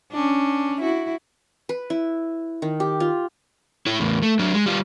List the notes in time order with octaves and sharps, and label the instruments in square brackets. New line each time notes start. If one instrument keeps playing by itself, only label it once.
[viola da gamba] C#4 D4
E4 F#4
[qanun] B4
E4
D#3
G4
F4
[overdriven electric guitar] E4 C#5
E2 A2
A3
F#3 D4
G#3
G3 F4